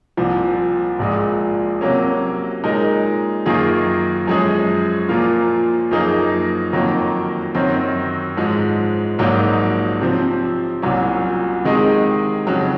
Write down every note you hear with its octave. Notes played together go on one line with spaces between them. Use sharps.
C2 A#2 F3
A#1 A#2 G#3
C3 F#3 A#3 C#4
A#2 G#3 D#4 A#4
F#2 D#3 A#3 F4 G#4
F#2 F3 G#3 C#4 G#4
A#2 F3 A#3 F4
F#2 F3 A#3 D#4 G#4
F2 D#3 F#3 A#3
F#2 D#3 F#3 C4
G#2 F3 G#3
A#1 G#2 F#3 A#3 D#4
C3 F3 C4
C2 A#2 F#3 C#4
C3 D#3 G#3 D#4 G#4
F2 C#3 F#3